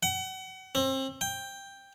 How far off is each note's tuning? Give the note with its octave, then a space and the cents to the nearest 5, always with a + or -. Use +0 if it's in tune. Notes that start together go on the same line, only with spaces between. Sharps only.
F#5 +35
C4 +30
G5 +10